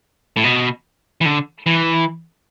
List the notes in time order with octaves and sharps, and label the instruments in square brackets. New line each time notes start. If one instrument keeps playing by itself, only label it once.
[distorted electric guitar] A2
B2
E3
D3
E3